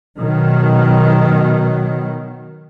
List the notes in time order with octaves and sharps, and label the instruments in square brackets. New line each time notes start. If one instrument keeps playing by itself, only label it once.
[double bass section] B2 D#3 F#3